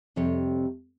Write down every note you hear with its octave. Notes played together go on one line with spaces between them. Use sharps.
F2 C3 G3 C#5